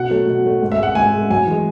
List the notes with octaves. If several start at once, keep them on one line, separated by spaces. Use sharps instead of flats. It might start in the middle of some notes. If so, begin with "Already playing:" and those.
Already playing: B2 F#5
F#3 A3
B2
F#3 A3
G#2
E5
G#3 F#5
G#2 G#5
G#3
F#2 G#5
E3 G#3